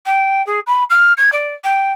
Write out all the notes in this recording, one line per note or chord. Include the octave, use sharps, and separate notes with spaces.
G5
G#4
B5
F6
G#6
D5
G5